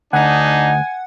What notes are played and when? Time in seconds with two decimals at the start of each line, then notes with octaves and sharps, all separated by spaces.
0.13 D2 D4 D#4 F#5 G#5